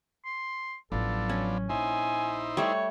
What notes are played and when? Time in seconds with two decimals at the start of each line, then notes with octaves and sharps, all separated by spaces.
0.25 C6
0.92 A1 F3 F#3 B3 D4 A4
1.29 C#4
1.70 A#1 D#4 E4 C5 G#5
2.57 G3 A3 C#5